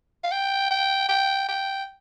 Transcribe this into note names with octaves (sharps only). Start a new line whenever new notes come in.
F5
G5
G5
G5
G5